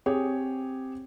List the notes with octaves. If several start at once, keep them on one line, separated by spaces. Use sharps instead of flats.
C4 G4 G#4 C#5